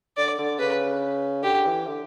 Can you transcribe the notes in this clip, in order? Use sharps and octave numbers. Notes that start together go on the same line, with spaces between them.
D3 D5
D3
C#3 B4
D3 G4
E3
D3